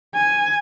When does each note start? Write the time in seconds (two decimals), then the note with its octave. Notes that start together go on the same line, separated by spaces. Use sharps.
0.14 G#5